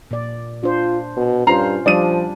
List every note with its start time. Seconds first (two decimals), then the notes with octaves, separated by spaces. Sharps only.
0.11 A#2 D5
0.63 D4 F4 C5
1.17 B2
1.47 G2 C#4 F4 C5 A#5 C7 F7
1.86 F3 G3 D4 F4 D5 D#6 D#7